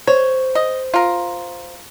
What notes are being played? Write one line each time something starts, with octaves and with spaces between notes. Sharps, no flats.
C5 C#5
D#5
F4 A#4